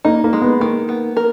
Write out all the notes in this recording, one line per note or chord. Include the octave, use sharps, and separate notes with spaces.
A#3 D#4
A#3
G#3
B3
D#3 A#3
B3
A#4